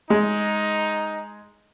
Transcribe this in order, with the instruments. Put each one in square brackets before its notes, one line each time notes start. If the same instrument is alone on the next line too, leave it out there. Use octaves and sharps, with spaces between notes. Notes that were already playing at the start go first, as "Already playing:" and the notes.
[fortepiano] G#3 [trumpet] D#4